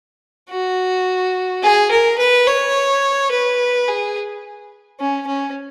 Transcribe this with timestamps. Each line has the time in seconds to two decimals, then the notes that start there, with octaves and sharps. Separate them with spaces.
0.50 F#4
1.63 G#4
1.91 A#4
2.18 B4
2.47 C#5
3.31 B4
3.88 G#4
5.00 C#4
5.27 C#4